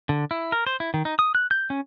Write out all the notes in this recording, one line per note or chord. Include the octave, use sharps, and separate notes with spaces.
D3
E4
A#4
C5
E4
D#3
D#4
D#6
F#6
G6
C#4